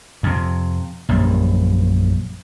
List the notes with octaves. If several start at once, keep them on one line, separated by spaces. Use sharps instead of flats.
F2 C3
A#1 F#2 G3